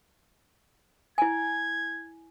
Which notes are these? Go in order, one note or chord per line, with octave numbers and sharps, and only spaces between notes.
E4 G#5 G#6